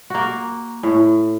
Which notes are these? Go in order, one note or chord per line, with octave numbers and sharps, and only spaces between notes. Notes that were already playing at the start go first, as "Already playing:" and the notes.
A#3 F#4
A2